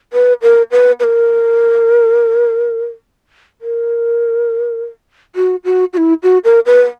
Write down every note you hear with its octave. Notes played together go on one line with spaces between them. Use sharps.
B4
A#4
B4
B4
A#4
A#4
F#4
F#4
F#4
E4
F#4
A#4
B4